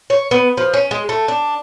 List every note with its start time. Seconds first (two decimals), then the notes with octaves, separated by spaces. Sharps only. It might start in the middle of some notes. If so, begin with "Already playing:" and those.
0.10 C#5
0.31 B3
0.57 F3
0.73 C#4
0.91 G#3
1.09 A3
1.28 D4